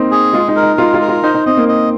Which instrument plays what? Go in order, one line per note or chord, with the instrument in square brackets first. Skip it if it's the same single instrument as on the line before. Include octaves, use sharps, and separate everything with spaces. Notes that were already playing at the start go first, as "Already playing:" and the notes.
Already playing: [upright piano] A#3 C4 D#4
[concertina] G#4
[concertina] G#3 [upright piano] F4
[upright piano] D#4
[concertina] A#4
[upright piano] D#4
[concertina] G#3 [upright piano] F4
[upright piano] F4
[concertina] A#4
[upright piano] F4
[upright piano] D#4 [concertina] C5
[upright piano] D#4
[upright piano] C4 [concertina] D#5
[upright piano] A#3
[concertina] D#5